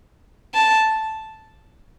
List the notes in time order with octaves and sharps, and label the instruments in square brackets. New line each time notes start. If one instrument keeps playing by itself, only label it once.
[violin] A5